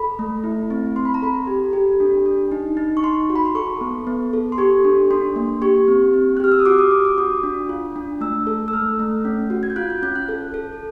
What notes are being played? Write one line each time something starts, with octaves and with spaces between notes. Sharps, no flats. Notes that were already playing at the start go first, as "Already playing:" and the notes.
Already playing: A4 B5
A3
E4
C4
C4 C6
B5
A#5
A4 B5
G4
G4
D4
D4
D#4
D#4
C#6
D#4 C6
F#4
B5
C6
A4 C#6
B3
B3
A4
C6
G4 C#6
D4
D4 C6
A#3
G4 C#6
C4
C4
F#6
G4 F6
E6
D#6
F#4 D6
D#6
F#4 D6
D6
F#4 D#6
D4
F4
D4
A3 E6
A4
E6
A3 F6
A3
C#4
F#4
G#6
G6
F4 F#6
G6
C#4 G6
F#6
A4
A4